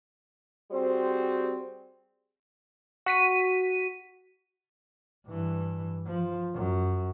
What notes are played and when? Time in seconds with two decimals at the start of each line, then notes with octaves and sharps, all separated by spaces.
0.72 G3 C4 F#4 G#4 C5
3.06 F#4 B6 D#7
5.27 G2 E3
6.07 F3
6.54 F#2